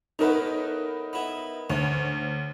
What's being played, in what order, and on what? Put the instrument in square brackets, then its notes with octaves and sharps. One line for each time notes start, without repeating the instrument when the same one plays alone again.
[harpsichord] A2 A3 B3 [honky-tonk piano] D#4 A#4 B4
[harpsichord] B3 E4
[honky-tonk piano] D2 [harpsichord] C#4